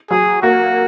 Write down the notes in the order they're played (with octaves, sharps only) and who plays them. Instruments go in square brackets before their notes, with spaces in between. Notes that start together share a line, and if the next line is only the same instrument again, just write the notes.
[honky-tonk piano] F#3 [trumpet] G#4
[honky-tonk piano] A#3 [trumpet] F#4